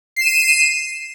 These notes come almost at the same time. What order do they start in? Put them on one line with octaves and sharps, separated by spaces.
C7 E7 D#7